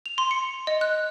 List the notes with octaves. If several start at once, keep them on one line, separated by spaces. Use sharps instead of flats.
F7
C6
C#7
D#5
F#6